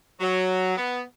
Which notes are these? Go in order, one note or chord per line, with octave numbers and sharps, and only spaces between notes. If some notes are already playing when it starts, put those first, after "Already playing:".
F#3
B3